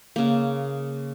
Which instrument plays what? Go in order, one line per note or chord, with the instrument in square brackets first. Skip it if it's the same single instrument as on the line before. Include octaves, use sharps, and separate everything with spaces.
[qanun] C#3 A#3